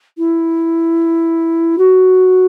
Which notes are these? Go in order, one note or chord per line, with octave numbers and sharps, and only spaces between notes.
E4
F#4